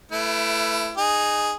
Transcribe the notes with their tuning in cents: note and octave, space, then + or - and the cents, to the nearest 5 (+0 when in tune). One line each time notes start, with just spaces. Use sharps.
A3 +0 E4 +25 B4 +0
D#4 -25 G#4 +0